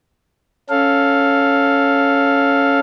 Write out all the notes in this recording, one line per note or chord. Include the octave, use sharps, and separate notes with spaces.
C#4 A4 F5